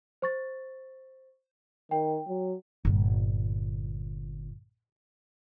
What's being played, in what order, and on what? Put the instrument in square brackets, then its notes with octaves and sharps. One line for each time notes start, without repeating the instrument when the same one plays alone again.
[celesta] C5 C#6 A6
[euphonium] D#3 [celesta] G5
[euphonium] F#3
[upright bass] G1 A#2